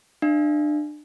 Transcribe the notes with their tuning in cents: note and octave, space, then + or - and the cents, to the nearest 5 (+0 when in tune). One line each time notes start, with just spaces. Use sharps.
D4 +30 F5 -40